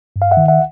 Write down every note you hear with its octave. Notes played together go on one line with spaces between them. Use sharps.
G2
F5
E5 F#5
D#3
E5 F#5